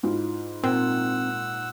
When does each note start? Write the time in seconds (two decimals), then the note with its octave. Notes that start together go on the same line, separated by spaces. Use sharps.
0.03 G#2 E4 F4
0.64 A#2 C4 F#5 E6